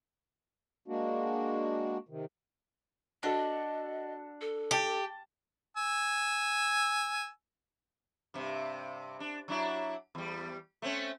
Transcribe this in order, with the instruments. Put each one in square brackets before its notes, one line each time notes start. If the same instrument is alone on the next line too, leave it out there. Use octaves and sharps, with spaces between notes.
[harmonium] G#3 A#3 D4 F#4
C3 D#3
[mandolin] D4 [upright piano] F#4 A4 [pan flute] D#5
[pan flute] A4
[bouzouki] G4 [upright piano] A5 A6
[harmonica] G#5 E6
[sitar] G2 C3
D4
F#3 D4 E4
E2 G3
A3 C4 C#4